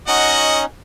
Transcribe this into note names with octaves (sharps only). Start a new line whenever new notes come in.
C#4 D#4 F#4 D#5 F#5